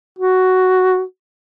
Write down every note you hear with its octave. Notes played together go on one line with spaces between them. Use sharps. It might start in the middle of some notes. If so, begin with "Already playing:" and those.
F#4